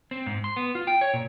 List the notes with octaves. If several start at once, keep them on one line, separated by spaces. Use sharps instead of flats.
C4
G#2
C6
B3
F4
G5
C#5
A#2